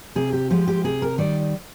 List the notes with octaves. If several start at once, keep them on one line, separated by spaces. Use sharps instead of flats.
C3 G#4
G4
F3 G#3 G4
G4
C3 G#4
A#4
D#3 G3 D5